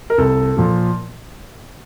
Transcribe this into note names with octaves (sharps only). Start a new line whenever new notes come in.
A#4
C2 A4
A#2 F3 A#3